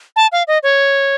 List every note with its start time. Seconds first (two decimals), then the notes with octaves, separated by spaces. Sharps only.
0.16 A5
0.32 F5
0.47 D#5
0.63 C#5